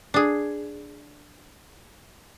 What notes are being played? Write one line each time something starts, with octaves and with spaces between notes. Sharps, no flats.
D4 G#4